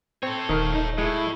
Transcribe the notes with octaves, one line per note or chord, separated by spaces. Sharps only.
C4 A4 C#5
D#1 D#3 A#4
D#4
A2 G#3 E4